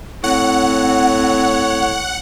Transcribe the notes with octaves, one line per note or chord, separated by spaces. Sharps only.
A2 C4 C#5 F#5